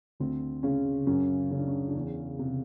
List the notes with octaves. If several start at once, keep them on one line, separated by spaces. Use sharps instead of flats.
D2 C4
C#3 C#4
F#2 C#4
C#3 C#4
D4
C#4
D4
E2 C#4
C3